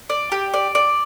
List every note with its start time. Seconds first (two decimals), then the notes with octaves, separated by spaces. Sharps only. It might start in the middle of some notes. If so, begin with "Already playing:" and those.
0.10 D5
0.32 G4
0.54 D5
0.75 D5